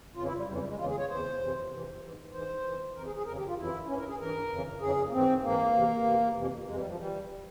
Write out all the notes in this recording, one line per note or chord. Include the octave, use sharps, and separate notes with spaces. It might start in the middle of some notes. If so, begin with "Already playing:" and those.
F2 C#3 E3 F4
E4
G3
F2 C#3 E3 G3
G3
G#3
E2 C#3 E3 F4
G#4
C#5
E2 C#3 E3 C5
F2 C3 E3
F2 C3 E3
G#2 E3
G#2 E3 C5
F2 E3
F2 E3 A#4
G#4
G#4
F2 C#3 E3 A#4
G4
F4
F2 C#3 E3 E4
E4
G2 E3 C#4
A#4
G#4
G2 E3 A#4
F2 C#3 E3
F2 C#3 E3 G#4
A#3
G#2 E3 C4
G#2 E3 A#3
E2 C3 E3
E2 C3 E3
F2 C3 E3
F2 C3 E3 G#3
G3
F3
E3 G3